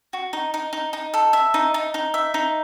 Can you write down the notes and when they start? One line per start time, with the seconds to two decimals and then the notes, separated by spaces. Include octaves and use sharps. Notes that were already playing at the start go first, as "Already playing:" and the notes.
0.13 F#4
0.33 D#4
0.54 D#4
0.73 D#4
0.93 D#4
1.14 A4
1.33 E5
1.54 D#4
1.74 D#4
1.94 D#4
2.14 E5
2.34 D#4